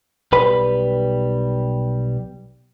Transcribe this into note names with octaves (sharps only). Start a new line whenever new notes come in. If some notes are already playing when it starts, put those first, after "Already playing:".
B1 G3 B4 B5